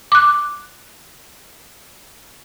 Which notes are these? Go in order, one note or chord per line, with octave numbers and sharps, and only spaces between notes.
D6 F#6